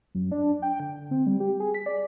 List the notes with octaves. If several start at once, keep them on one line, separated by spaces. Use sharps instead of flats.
F#2
D4
G5
D3
C4
G3
G4
G#4
B6
D5